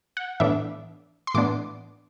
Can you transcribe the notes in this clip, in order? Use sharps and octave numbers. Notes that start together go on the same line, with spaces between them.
F#5
A2 E3 B3 D4 E5
C6
A2 E3 B3 D4 D6